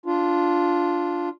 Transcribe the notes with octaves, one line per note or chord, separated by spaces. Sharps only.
D4 F4